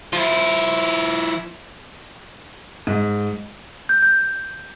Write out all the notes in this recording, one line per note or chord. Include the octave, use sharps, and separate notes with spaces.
F3 E4
G#2
G6
G6